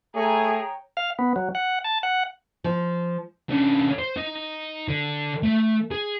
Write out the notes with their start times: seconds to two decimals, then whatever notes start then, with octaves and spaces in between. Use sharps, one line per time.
0.15 A3 G#4 C#5 G5 G#5 A#5
0.97 F5
1.19 B3
1.36 F#3
1.55 F#5
1.84 A5
2.03 F#5
2.64 F3
3.50 D3 C#4
3.99 C5
4.17 D#4
4.89 D3
5.43 A3 E5
5.92 G#4